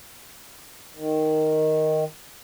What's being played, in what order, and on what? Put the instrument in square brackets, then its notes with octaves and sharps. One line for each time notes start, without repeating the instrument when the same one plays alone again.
[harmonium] D#3